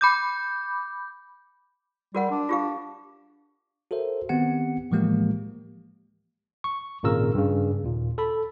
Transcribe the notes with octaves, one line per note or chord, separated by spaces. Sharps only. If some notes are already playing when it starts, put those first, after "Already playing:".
B5 D6 G6
G3 F#4 A#4 F#5
D4
F4 G4 F5
F#4 A4 A#4 C5 E5
D#3 B3 C4 G4 F#5 C#7
A2 E3 F3 G#3 A#3 G4
C#6
G#1 A#2 C#3 A#4 E6
G2 C#3
D#2 A#2
A4 B5